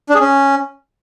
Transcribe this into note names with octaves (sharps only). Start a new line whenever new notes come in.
D4
G#4
C#4